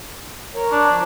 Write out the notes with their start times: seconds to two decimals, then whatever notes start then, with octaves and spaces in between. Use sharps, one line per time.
0.55 A#4 C#5
0.72 D4
0.87 F3